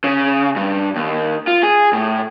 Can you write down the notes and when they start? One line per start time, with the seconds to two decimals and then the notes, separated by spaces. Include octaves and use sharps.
0.04 C#3
0.56 G2
0.96 D#2
1.47 F4
1.63 G#4
1.93 A2